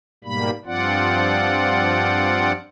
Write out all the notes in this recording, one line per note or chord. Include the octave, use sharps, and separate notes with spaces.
G#2 B2 G3 A#3 B5
G2 F3 C4 F4 D5 F#5